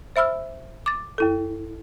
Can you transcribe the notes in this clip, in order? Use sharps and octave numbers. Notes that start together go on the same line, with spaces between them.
C5 E5 B5 E6 F6
D6 A6
F#2 E4 A4